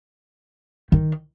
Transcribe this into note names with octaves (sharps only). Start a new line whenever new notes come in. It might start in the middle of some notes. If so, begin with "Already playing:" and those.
D#3